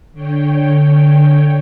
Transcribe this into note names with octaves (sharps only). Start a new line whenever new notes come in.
D3 C#5 G5